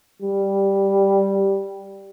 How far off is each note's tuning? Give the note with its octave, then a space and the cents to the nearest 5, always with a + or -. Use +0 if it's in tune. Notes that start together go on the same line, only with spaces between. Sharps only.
G3 +0